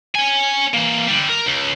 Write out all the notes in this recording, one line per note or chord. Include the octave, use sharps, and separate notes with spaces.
C#5 G#5
E3 A#3
D3 G3
A#4
C#2